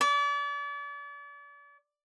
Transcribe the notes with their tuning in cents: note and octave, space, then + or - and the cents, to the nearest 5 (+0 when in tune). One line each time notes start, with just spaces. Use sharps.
D5 -40